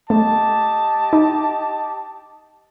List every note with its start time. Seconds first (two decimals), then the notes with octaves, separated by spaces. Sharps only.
0.10 A3 G4 D#5 A5
1.13 D#4